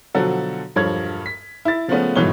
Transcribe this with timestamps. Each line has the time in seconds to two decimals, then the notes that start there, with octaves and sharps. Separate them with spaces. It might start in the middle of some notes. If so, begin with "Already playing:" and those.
0.15 B2 D3 F3 F#3 F#4 A4
0.76 E1 G2 F3 A4 C#5 G#6
1.26 B6
1.65 E4 A6
1.88 C#3 F3 G#3 A3 B3 C#4
2.16 G1 G#2 B2 E3 C#5 G7